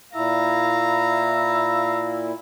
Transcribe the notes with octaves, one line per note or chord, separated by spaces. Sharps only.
A#2 E4 E5 F5 A#5